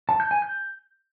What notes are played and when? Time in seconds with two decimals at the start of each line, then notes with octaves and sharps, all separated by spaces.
0.09 A5
0.20 G6
0.31 G#5
0.42 G6